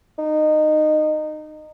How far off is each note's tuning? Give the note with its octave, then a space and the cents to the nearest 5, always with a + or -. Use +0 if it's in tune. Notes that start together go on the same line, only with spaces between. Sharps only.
D#4 -20